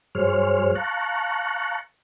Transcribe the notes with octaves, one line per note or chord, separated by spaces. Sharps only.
G2 F#3 G#4 C5 C#5 F6
F5 A5 A#5 C#6 F#6